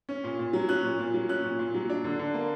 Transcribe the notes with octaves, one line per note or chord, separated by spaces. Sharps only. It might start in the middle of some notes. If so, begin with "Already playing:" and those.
C#4
A#2
A#2
F#3
C#4 F#6
A#2
A#2
F#3
C#4 F#6
A#2
A#2
F#3
D4
D3
D3
A#3